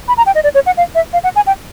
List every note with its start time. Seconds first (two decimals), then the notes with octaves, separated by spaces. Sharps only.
0.08 B5
0.17 A#5
0.26 G5
0.35 D#5
0.44 D5
0.55 C#5
0.66 F#5
0.77 F5
0.95 E5
1.13 F5
1.24 F#5
1.36 G#5
1.47 G5